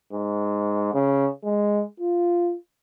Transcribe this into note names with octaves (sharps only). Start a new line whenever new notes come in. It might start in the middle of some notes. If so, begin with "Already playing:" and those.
G#2
C#3
G#3
F4